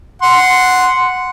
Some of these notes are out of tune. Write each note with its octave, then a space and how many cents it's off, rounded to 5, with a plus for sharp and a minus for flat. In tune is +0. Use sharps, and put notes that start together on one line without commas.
F#5 -5 C6 -10